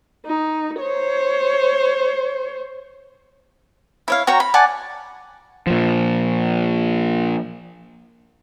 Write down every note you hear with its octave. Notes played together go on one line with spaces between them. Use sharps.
D#4
C5 C#5
E4 C#5 F5
F#4 C#5 G5 A#5
B5
D5 F#5 G#5 A5
A#2 F3